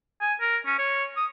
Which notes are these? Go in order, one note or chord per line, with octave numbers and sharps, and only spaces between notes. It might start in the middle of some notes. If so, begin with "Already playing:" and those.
G#5
A#4
C#4
C#5
D#6